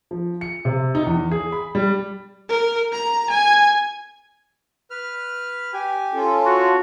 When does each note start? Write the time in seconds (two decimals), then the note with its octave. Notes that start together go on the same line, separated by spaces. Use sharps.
0.11 F3
0.41 C#7
0.65 C3
0.95 D#4
1.06 E2
1.31 G#4
1.52 B5
1.75 G3
2.49 A#4
2.93 A#5
3.30 G#5
4.91 B4 F6
5.74 G4 G#5
6.13 C#4 F4 A4
6.46 F#4 C#5